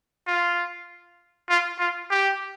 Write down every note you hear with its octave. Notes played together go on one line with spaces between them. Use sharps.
F4
F4
F4
G4